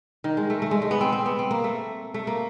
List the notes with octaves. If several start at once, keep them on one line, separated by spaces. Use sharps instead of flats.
D#3
G#3
A3
A3
G#3
G#3
B3
C4
C4
B3
C4
A#3
A3
A3
A#3